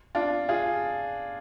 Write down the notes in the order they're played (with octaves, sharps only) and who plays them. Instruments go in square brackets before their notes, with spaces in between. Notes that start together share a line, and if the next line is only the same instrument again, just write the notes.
[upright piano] D4 F4
F4 G#4